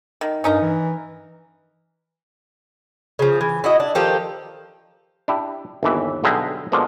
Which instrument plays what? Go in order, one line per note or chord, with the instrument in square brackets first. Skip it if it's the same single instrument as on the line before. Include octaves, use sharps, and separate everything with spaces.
[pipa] D#3
[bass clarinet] G2 [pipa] C#4 D#4 A#4
[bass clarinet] E3
[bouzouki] C#3 F3
E3
E4 F#4 D#5
D4
D#3 F3 G4 A4
[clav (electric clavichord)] D4 E4 G4
G1 D#2 E3 E5
B1 D3 G3 G#4 E5 A#5
B2 D3 F3 G#3 A#3